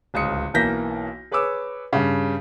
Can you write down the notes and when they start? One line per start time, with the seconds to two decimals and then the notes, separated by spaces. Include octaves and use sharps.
0.14 D1 C#2 D#6 C#7
0.54 B1 E3 A#3 G6 A#6 B6
1.31 G#4 B4 C#5 D6 E6
1.93 G2 C#3